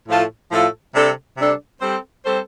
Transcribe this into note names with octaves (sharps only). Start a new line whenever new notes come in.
A2 F3 A3 F4 A4
A2 F3 A3 F4 A4
C3 G3 D4 A4
C3 G3 D4 A4
G3 C4 A4 C5
G3 C4 A4 C5